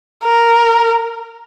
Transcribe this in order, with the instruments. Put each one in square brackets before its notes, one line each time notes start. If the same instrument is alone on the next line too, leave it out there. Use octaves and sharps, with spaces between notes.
[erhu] A#4